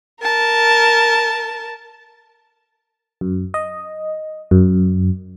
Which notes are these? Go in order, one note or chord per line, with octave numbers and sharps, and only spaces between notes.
A#4 A5
F#2
D#5
F#2